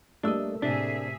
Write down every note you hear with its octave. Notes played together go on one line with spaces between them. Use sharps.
G3 A3 A#3 D4 D#5 E6
A2 C3 D4 G#4 E5